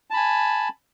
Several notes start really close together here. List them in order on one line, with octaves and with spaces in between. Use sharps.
A5 B5 G#5